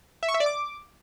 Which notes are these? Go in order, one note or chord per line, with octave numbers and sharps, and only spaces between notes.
E5
C#6
E5
D5
D6